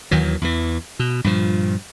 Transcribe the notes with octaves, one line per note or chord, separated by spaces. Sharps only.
D#2 D#3 E3 F#3
E2 E3
B2
G2 A#2 F3